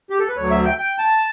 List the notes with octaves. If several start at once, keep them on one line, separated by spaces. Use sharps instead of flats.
G4
A4
B4
D2 D3 F#3 C#5
E5
G5
G5
A5